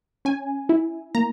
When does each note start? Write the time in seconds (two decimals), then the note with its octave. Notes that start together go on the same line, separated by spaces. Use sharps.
0.25 C#4 G#5
0.69 E4
1.15 A#3 A#5